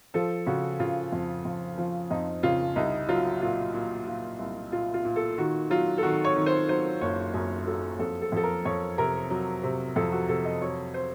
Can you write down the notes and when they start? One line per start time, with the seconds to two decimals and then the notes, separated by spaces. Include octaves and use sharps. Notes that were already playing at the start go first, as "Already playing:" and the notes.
0.14 F3 A4
0.46 C#3 F#4
0.79 C#3 F4
1.12 F2
1.45 F2
1.78 F3
2.11 F2 D#4
2.43 C#3 F4
2.76 C2 D#4
3.08 F#3 F4
3.41 A#2 F4
3.74 A#2
4.07 A#2
4.39 C2
4.72 A#2 F4
4.94 F4
5.05 A#2
5.16 A4
5.38 D#3 F#4
5.70 F#3 F4
5.98 A4
6.03 D#3 F#4
6.24 C#5
6.36 D#3
6.46 C5
6.69 F#3 C5
7.01 F#1 C#5
7.34 F#2
7.67 F#3 A4
7.99 F2 A4
8.21 A4
8.32 F2 A4
8.43 A#4
8.65 F2 C#5
8.98 C3 A#4
9.30 F#3
9.63 C3
9.96 F2 A4
10.12 F#4
10.28 C3 A4
10.45 D#5
10.61 F#3 C#5
10.94 C5